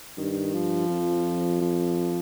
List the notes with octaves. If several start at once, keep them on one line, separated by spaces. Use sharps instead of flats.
G2 D#3
F3
F2
F3